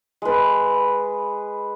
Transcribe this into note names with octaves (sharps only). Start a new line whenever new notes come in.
G#3 B4